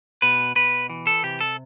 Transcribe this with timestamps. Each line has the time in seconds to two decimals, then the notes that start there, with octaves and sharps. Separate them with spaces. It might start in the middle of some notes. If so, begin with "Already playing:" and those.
0.22 B2 B4
0.56 B2 B4
0.90 E3
1.07 A4
1.23 C3 G4
1.41 A4